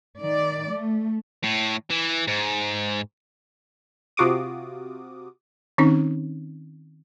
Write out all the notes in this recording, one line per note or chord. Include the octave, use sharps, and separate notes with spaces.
D#3 D5
A3
A2
E3
G#2
C3 F4 F#4 D6 D#6
D#3 C4 C#4 D#4